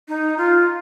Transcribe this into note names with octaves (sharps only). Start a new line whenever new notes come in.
D#4
F4